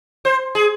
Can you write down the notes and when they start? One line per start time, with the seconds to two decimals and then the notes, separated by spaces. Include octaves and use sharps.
0.25 C5
0.55 G#4